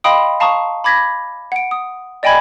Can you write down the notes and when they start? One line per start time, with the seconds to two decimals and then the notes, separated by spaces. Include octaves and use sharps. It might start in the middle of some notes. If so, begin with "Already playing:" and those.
0.04 D#5 F5 G5 B5 C6 D#6
0.40 F5 A5 A#5 C#6 D#6
0.84 B5 D6 G#6 A#6 B6
1.52 F#5 D7
1.71 D#6
2.23 D5 D#5 G5 G#5 B5 G#6